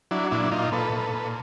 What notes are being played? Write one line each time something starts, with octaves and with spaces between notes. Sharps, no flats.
F#3 D4 E4
A#2 D4 E4
A#2 D#4 F4
A#2 A4 B4
A#2
A#2